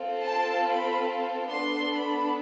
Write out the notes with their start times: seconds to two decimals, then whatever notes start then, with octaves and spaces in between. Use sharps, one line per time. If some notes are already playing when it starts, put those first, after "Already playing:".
Already playing: C4 F4 A4
0.24 A5
0.66 B5
1.50 B3 D4 A4 C6
1.93 B5